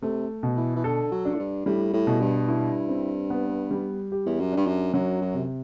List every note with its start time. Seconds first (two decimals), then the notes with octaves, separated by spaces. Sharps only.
0.02 C3 A3
0.43 B2
0.57 E3
0.76 E3
0.84 D3 A4
1.11 F#3
1.25 D4
1.34 A2
1.39 G2
1.66 A2 G3
1.93 A2
2.07 B2
2.20 G2
2.49 E4
2.89 C4
3.30 B3
3.71 G3
4.12 G4
4.26 E2
4.40 F#2
4.52 G2 D4
4.67 F#2
4.94 F#2 F#3
5.21 F#2
5.34 C3